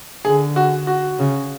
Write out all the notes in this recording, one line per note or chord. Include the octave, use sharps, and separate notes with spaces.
D3 G#4
F#4
F#4
C#3